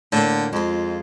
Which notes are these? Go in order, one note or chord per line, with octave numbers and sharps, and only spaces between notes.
A2 D3 A#3
F2 G#3 F4